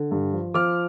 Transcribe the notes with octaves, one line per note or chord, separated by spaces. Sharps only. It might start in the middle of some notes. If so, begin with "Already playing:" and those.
Already playing: D3
G2
F3
F3 D6 F6